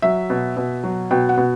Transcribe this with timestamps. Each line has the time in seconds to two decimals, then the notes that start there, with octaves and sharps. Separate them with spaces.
0.02 F#3 E5
0.30 B2
0.57 B2
0.84 F#3
1.11 B2 G5
1.29 F#5
1.37 B2